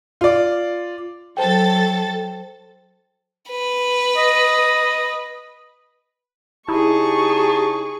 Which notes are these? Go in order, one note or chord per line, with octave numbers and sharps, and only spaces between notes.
F4 D5
F#3 A4 C5 G5 A6
B4
D#5
C#3 D#4 E4 G4 G#4 A5 C#6